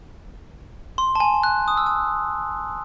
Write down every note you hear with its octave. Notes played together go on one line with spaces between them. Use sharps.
C6
A5
G#5
F#6
D#6
E6
D#6